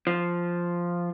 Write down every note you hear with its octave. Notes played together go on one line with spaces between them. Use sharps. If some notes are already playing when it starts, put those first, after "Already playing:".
F3